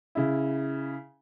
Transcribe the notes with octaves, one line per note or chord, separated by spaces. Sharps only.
C#3 E4